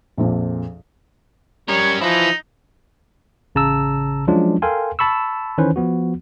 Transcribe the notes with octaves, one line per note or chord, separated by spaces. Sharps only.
A#1 F2 A#2
G3 C#4 A#4 C#5
E3 F3 D#4 E4
A1 C#3 A5 A#5 E6
F3 F#3 G#3 C#4 D4 F4
A4 A#4 F5 G5 G#5 C6
A5 B5 C#6 E6
D#3 E3 C#4 B4 C5
F3 B3 F#4